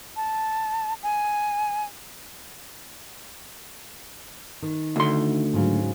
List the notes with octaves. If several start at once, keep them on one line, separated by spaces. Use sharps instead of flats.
A5
G#5
D#3
D2 C6
G#2 C#3 F#3